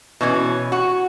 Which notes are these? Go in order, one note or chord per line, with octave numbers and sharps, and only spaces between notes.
B2 E3 C#4
F#4